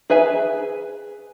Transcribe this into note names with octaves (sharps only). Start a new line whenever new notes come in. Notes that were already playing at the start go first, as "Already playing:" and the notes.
G#4 B4 E5 G#5